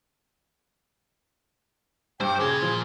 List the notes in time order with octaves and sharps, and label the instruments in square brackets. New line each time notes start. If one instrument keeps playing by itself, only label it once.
[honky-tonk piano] G2 [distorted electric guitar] C5 [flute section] G5 D6
[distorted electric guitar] A#2 C6 [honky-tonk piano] C#3 [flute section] G#4
[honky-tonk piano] F3